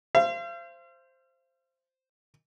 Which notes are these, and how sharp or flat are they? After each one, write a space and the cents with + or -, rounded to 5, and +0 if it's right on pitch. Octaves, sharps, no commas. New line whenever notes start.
C5 +0 F5 -40